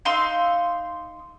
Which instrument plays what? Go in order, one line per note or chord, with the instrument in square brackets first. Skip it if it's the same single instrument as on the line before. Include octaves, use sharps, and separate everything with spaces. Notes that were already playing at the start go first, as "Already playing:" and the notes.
[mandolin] D#4 F5 C6 E6